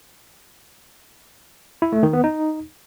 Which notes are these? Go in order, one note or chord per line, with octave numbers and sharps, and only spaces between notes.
E4
A3
D#3
B3
D#4